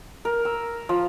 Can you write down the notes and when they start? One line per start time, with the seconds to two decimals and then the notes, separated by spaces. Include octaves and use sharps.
0.25 A#4
0.45 E6
0.89 F3